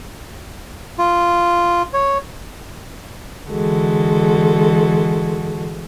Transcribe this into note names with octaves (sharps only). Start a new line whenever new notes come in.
F4
C#5
D3 E3 G#3 F#4 A4